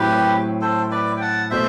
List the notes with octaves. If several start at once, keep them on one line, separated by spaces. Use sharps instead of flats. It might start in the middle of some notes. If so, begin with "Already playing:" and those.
Already playing: A2 F#3 C4 E4 G4 B4
A4 C5
B4 D5
G5
F#5 A5
B2 A3 C5 E5